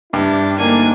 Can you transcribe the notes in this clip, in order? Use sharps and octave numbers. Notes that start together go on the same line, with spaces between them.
G2 G3 D4 E4
D2 A#3 D4 D#4 G#5